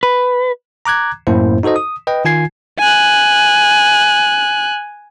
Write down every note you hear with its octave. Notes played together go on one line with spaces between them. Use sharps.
B4
A#5 D6 F#6 G#6
F#2 A2 A#3 E4 C5
D#4 F#4 A4 C5 D#5
D#6
B4 D#5 G5
D#3 F4 G#5 G#6 C7
G#5 F#6